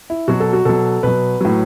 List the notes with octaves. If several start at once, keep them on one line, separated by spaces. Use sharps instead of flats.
E4
B2 F#3 F#4
A4
F#4
B2 F#3 A4
B2 F#3 B4
A2 F#3